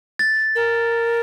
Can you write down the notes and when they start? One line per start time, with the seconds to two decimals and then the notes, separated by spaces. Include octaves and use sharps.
0.19 A6
0.55 A#4